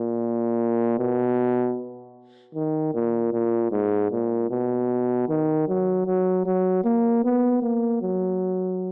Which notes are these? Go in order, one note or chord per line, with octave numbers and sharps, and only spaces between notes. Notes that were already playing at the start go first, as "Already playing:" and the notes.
Already playing: A#2
B2
D#3
A#2
A#2
G#2
A#2
B2
D#3
F#3
F#3
F#3
A#3
B3
A#3
F#3